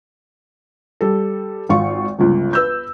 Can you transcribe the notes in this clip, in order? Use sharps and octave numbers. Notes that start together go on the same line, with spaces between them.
G3 A4
G#1 F4 C#6
G1 C#2
B4 E6 G6